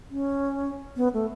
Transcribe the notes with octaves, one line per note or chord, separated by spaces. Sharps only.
C#4
B3
A3